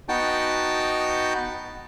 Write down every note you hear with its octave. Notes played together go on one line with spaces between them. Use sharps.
B3 D#4 F#4 G5 A5